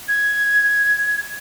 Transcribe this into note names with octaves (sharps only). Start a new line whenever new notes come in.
G#6